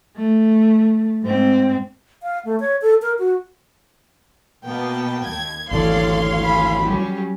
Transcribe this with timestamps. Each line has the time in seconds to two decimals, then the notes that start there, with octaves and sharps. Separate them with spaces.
0.17 A3
1.24 G#2 C4
2.23 F5
2.45 A3
2.60 C#5
2.82 A4
3.02 A#4
3.19 F#4
4.65 B2 A#3 B3 G5 A5
5.25 D#2 G#6
5.71 G#1 D2 E3 A4 C#5 D5 F5 C6
6.43 G#4 B5
6.83 F#3 G3 C#4 G4